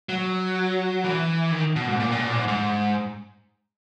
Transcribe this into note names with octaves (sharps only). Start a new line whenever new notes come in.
F#3
E3
D#3
B2
G#2
A#2
B2
A#2
G#2
G#2